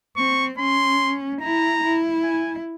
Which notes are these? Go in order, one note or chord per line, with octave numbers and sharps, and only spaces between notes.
C4 C#6
C#4 C6
E4 A#5
E4
G#5